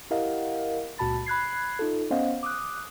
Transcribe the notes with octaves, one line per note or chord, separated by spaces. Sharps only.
E4 G4 A#4 D#5 F5 F#5
C#2 A#2 F#4 A5 B5 A6
B5 F#6 G#6 C7
D#4 F4 A4
B3 C#4 C5 D#5 F5 F#5
D6 D#6 F#6